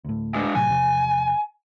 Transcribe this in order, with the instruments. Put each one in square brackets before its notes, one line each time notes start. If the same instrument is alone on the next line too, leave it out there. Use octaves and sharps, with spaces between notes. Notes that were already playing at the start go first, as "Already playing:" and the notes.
[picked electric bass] D2 A2
[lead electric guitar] G#3 D4
[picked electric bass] A2 C3 F#3 [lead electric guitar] G#5
[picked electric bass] E2 C3 F3